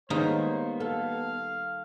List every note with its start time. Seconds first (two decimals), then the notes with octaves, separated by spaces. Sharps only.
0.10 D#3 G3 G#3 A#3 B3 C#4 D#4 C5
0.80 A4 F5